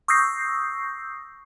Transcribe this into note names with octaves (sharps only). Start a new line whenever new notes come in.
C#6 D#6 E6 G6 A#6 C7